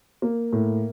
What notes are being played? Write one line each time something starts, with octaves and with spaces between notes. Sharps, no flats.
A#3
A2